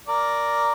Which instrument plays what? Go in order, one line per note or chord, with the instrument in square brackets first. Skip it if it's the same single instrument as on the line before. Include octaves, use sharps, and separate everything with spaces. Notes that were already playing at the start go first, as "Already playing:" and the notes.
[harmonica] A#4 D5